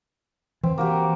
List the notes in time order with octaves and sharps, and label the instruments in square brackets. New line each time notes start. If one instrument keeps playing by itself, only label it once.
[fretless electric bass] E3 [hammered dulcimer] C4
[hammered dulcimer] A#3 F#4 G4